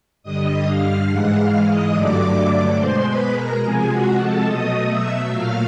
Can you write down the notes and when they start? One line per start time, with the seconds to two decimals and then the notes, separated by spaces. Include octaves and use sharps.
0.23 G2 D3 G3 D#5 D#6
0.65 F5 F6
1.08 G#2 E3 G#3 F#5 F#6
1.36 F5 F6
1.65 D#5 D#6
1.93 G2 D3 F#3 A3 D5 D6
2.76 B2 G#3 C5 C6
3.05 B4 B5
3.33 A#4 A#5
3.61 C3 F3 G#3 G#4 G#5
3.90 F#4 F#5
4.18 A4 A5
4.46 B2 F#3 A3 D#5 D#6
4.89 E5 E6
5.30 A#2 F#3 A3 F5 F6